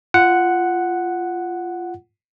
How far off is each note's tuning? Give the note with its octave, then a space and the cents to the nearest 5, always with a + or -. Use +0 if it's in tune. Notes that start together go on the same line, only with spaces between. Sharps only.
F4 -15 F#5 +0